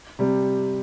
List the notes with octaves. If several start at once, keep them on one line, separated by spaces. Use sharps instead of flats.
C3 G3